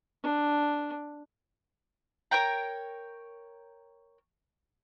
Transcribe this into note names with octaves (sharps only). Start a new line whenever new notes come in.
D4
A#4 C#5 G5 A#5